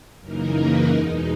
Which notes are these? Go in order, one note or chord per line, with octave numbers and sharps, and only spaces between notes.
F#2 C#3 E3 A#3 D#4 A#4
B4
E2 B2 G#3 D#4 A#4